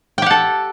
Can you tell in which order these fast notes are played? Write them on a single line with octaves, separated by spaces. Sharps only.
G5 G4 F#5 A4